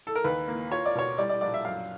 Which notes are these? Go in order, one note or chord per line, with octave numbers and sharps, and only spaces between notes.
A4
A#4
D#2 B4
A#3
F4 C#5
D5
B2 C#5
G3 D5
D5
A#1 D5
E5
F#2 F5